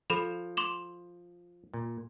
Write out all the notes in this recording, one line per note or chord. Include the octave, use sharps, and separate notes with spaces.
F3 A4 B5 F7
C6 D6 E7
A#2